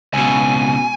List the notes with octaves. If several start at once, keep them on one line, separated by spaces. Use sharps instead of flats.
C#2 B2 G#5